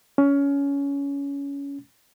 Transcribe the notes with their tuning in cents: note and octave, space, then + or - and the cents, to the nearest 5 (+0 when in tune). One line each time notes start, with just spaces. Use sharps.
C#4 +20